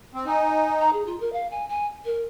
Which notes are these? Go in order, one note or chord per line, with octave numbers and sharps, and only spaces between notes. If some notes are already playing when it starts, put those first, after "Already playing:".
C4
D#4 G#5
A#5
G#4
F4
A#4
F5
G#5
G#5
A#4